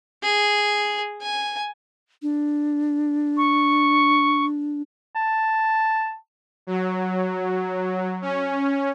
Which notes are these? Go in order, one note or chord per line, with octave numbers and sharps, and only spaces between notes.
G#4
G#5
D4
C#6
A5
F#3
C#4